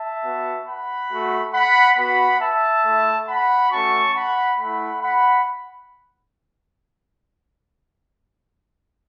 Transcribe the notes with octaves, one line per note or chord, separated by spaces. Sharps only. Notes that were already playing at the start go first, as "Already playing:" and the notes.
Already playing: E5 A5
B3 F#4
F#5 B5
A3 F#4
F#5 B5
B3 F#4 F#5 B5
E5 A5
A3 E4
F#5 B5
A3 C#4 F#4 A5 C#6
F#5 B5
A3 E4 F#5 B5
F#5 B5